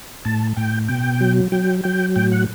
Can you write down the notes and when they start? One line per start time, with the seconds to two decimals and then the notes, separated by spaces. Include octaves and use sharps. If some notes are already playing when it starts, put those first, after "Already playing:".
0.25 A2 A5
0.56 A2 G5
0.88 B2 G5
1.21 F#3
1.52 F#3 G5
1.84 F#3 G5
2.16 A2 G5
2.32 F#5